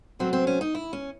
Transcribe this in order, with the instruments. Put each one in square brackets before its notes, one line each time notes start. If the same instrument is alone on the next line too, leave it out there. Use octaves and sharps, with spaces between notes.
[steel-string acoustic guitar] C3 F#3 A3 C4
C4
C#4
D#4
E4
C#4